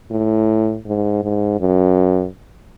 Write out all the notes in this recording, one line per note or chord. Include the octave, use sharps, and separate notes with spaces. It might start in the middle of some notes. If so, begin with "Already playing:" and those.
A2
G#2
G#2
F#2